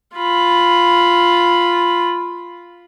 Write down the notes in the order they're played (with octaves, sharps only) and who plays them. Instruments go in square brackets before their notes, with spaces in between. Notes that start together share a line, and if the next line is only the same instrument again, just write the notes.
[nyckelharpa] F4 B5